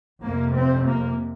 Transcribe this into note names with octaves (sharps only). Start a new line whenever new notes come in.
F2 C3 A#3
C4
A#3